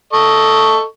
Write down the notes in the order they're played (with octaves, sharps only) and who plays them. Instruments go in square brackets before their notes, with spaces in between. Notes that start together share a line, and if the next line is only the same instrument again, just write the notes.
[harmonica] A4 D#5 C#6